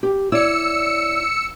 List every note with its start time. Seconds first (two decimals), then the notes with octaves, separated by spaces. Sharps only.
0.03 G4
0.32 E4 C#5 D5 E6 C#7